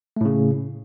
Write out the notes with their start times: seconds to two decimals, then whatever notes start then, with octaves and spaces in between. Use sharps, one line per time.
0.16 A3
0.21 A2
0.25 C#3